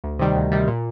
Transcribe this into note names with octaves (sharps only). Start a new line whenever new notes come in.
D2
C3 D#3 G3
D2
C3 D#3 G3
A#2